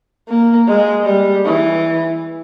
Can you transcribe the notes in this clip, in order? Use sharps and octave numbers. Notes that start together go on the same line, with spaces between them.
A#3
G#3
G3
E3